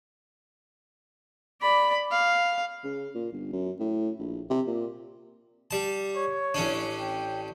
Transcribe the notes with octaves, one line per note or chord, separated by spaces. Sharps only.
D5 B5
F5
C#3
A#2
G1
F#2
A2
A#1
C3
A#2
G3 A5
C#5
A1 C#4 D4
G5